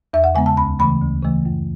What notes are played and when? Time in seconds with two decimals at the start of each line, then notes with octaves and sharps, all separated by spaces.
0.13 E2 E5
0.24 F#5
0.35 C#3 G#3 B3 G#5
0.46 A5
0.57 D2 B5
0.79 C#3 E3 A3 B5
1.02 D2
1.23 C#3 E3 A3
1.45 F#2